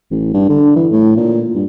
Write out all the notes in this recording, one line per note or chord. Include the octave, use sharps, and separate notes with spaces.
A1
G2
D3
E3
A2
A#2
G2